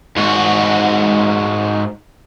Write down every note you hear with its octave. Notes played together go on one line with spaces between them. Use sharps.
G#2 F#4